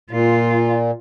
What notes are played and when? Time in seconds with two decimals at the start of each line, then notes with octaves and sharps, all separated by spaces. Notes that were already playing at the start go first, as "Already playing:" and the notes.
0.11 A#2 F4